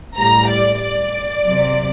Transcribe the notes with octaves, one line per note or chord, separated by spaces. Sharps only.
A2 G3 A#5
D5
D5
C3 F#3